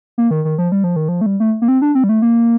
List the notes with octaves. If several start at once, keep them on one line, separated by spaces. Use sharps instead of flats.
A#3
D#3
D#3
F3
G3
F3
D#3
F3
A3
G3
A3
A#3
C4
D4
C4
G3
A3
A#3